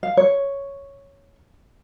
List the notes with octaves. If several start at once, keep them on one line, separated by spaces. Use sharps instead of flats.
F5
C#5